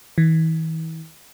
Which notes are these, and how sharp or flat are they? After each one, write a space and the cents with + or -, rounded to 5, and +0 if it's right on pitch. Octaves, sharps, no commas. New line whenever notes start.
E3 -40